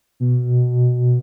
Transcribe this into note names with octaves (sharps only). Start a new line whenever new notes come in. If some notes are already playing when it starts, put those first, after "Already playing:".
B2